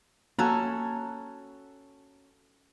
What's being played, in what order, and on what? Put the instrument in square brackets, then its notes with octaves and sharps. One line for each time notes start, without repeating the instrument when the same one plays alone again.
[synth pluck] A#3 A#5 G#6 [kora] C#4 F#4 A4